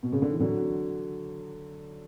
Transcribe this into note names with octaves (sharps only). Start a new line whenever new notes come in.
B2
C#3
D3
E3
D3 F#3